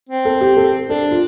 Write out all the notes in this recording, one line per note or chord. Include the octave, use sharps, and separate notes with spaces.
C4
A4
G4
A4
D4 A4
F4